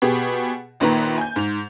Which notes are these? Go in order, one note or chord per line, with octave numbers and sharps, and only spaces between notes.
B2 G4 G#4
A#1 A#2 D#3 B4 A#5
G#5 G6
G#2 F7